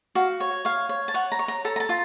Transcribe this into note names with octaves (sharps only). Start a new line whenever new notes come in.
F#4 F5
C#5
C#5 F5
C#5
A5
C#5 F#5
A#5
C#5
A#5
A4 A#5
A#5
A5
F4